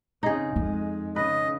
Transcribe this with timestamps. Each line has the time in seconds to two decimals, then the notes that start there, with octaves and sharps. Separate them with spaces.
0.23 C#3 C4 D#4 G#4
0.56 F2 G#3 C4
1.16 C#3 B4 D#5